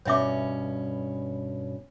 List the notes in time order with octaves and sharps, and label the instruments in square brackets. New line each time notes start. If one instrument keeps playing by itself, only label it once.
[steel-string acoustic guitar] G2 B2 C#4 [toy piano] C#5 E5 D6